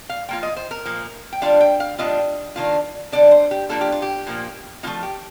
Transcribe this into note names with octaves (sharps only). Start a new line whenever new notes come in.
F5
F3 A#3 F4 G5
D#5
C5
A#4
A#2 F3 A#3
G5
D3 G3 D4 F4 F5
G5
F5
A2 G3 D4 F4 D#5
D#3 A#3 D4 F4
D3 G3 D4 D5
C5
G4
F3 A#3 D4 F4 A4
G4
F4
G4
A#2 F3 A#3
F3 A3 C4 D#4 F4
G4